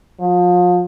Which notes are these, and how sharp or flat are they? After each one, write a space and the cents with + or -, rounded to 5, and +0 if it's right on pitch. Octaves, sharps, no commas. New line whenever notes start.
F3 +35